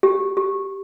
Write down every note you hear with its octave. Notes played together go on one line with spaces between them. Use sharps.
G4
G4